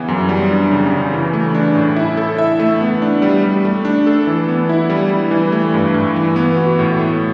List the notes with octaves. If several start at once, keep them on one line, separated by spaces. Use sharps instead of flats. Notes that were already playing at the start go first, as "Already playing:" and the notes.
Already playing: C#3 E3 B3
F#2
G3
D4
C#3
C#3
E3
A3
D4
A2
E4
A4
E5
A3
B3
D4
G3
G3
A3
D4
A4
E3
B3
E4
G3
G3
E3
A3
G2
G2
E3
B3
F#4
A2
A3